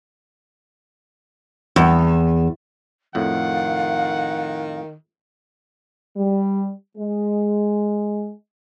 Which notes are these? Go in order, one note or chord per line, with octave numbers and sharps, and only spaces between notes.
E2
F2 A2 D#3 F5 F#5
G3
G#3